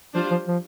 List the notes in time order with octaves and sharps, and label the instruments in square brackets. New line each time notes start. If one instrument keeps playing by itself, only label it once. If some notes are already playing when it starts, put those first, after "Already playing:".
[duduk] F3 [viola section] G3 D4 F4 C5
[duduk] F3
F3